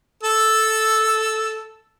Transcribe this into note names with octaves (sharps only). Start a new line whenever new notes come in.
A4 E6